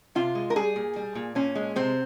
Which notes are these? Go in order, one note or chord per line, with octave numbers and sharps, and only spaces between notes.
C3 F4
G#3
A#4
G3 G#4
A#2
G3
A#2
A#2 C#4
G#3
C3 C4